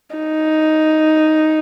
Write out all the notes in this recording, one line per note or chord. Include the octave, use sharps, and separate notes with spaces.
D#4